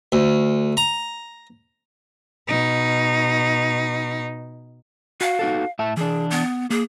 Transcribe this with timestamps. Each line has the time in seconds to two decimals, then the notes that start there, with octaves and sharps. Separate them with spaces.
0.12 D2
0.77 A#5
2.48 B2 D#4
5.21 F#4 F5
5.39 D#4 F#4 A4
5.79 A2 E5 A5
5.97 E3 D4 G#4
6.31 B3
6.70 A#3 G#4